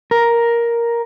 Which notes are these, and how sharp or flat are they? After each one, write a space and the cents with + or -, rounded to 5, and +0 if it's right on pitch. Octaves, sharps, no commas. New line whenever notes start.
A#4 +5